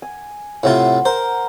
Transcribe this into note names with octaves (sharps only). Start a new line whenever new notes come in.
G#5
A2 C3 F4 F#5 C6
A#4 C5